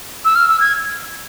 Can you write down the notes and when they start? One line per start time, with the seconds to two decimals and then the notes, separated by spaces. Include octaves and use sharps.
0.25 E6
0.35 F6
0.48 E6
0.60 G#6